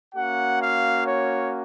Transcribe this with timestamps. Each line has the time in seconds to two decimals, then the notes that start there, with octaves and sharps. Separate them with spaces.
0.15 A#3 C#4 F#4 F#5
0.60 F5
1.05 C#5